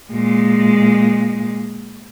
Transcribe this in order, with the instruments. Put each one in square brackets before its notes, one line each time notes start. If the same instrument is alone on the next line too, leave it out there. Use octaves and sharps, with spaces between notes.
[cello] A#2 G#3